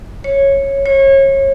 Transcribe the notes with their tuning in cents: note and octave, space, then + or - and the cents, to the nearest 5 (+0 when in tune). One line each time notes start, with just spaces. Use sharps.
C#5 -10
C#5 -30